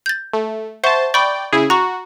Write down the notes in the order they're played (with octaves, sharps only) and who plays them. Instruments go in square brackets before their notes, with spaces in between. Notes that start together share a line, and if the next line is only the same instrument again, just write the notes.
[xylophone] G6 A6
[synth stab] A3
[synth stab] C5 A5 [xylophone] E5 F#5 C#6
[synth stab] D5 G5 [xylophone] B5 C#6
[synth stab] C#3 E4 G#4
[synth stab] F#4 [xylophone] A#5 C#6